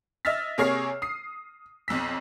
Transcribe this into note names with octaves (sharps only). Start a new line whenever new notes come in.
D#5 E5 E6 F6 A6 B6
C3 A#3 G#4 C#5 F6 C7
D#6 C7
B1 F2 E6 B6